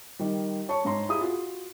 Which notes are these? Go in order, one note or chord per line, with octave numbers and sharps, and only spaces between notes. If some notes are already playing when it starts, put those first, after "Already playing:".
D#3 G3
C#5 A5 C#6
G#2 C#5 A#5 C6
E4 G4 G#4 F5 D#6
F4 F#4